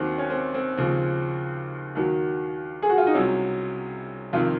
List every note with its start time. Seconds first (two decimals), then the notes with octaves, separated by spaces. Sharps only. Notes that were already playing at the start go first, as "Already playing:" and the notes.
Already playing: D#2 D#3 F#3 C4
0.18 C#4
0.30 C4
0.54 C4
0.77 D#2 C#3 F3 C4
1.95 D#2 D#3 F#3
2.82 G#4
2.90 F#4
2.98 F4
3.07 D#4
3.14 C2 C3 F#3 C#4
4.33 F2 C3 D#3 F4